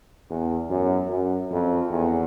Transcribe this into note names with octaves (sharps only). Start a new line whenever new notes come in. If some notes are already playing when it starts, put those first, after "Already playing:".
E2
F#2
F#2
F2
E2